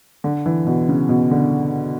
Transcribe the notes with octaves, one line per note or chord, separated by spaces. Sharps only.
D3
E3
B2
C#3
B2
D3